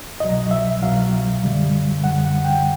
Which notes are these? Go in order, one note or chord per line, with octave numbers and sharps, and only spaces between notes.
C2 B2 F#3 D#5
E5
C2 B2 F#3 F5
F#2 D3 G3
F#2 D3 G3 F#5
F#5
G5